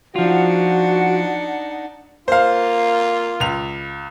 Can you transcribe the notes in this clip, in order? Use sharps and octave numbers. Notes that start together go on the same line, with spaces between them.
F3 D4 D#4 F4 F#4 F#5
A#3 F4 C5 F5
C#2 F7